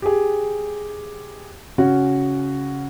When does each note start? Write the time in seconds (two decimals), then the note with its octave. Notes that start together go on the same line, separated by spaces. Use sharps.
0.02 G4 G#4
1.78 C#3 C#4 F#4